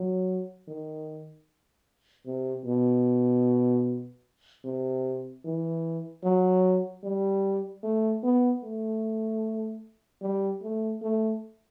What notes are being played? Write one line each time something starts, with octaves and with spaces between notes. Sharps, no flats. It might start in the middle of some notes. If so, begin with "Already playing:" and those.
Already playing: F#3
D#3
C3
B2
C3
E3
F#3
G3
A3
B3
A3
G3
A3
A3